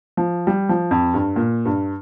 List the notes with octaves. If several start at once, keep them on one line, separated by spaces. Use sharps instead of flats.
F3
G3
F3
F2
G2
A#2
G2